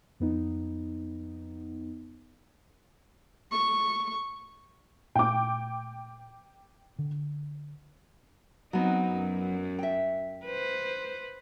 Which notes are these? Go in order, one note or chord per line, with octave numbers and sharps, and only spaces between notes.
F2 B3 D#4
C#6
A#2 A3 G5 D6
D3
F#3 B3 C4 D#4
F#2
E5 G5
B4 C5